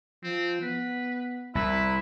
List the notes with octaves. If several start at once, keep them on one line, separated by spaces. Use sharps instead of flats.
F3 C4
B3 B4
C2 E4 B4